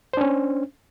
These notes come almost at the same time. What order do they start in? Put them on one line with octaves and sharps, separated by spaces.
C5 D4 C#4